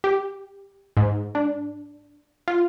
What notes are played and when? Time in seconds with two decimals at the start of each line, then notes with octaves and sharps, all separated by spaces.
0.04 G4
0.97 G#2
1.35 D4
2.48 F4